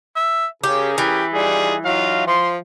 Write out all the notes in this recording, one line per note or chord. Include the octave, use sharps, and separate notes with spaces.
E5
C#3 C#4 G4 G#4 A#4
E3 G4
G3 D#4 F4 G#4
F#3 D#4 F4 F5
F3 C6